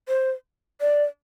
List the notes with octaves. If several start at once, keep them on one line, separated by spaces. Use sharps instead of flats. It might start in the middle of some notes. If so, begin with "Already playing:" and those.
C5
D5